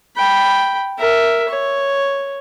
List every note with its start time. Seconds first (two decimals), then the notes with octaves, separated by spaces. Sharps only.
0.16 G5 B5
0.98 A#4 E5
1.48 C#5